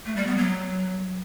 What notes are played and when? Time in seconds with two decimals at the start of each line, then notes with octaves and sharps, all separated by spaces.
0.06 A3
0.16 G3
0.27 B3
0.37 F#3